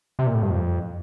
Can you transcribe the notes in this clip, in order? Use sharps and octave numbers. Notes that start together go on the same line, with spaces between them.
C3
A#2
A2
G2
F2